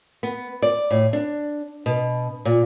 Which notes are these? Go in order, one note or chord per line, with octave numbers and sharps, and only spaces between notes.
B3
D5
A2
D4
B2
A#2